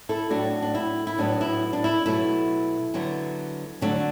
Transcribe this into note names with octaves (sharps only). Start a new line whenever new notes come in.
E4 A4
A2 F#3 A3 D4 F#4
D4
E4
E4
A2 F#3 B3 D4
E4
D4
E4
B2 F#3 A3 E4
D3 F#3 B3
D3 F#3 A3 D4 F#4